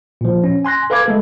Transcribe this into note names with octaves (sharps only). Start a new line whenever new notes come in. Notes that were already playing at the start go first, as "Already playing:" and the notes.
A#2 F3
C#4
G#5 C6 F#6 A#6
A4 B4 F5 B5 D6 G#6
G#3 A3 A4